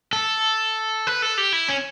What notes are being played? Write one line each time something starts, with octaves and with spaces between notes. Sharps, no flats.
A4
B4
A4
G4
E4
C#4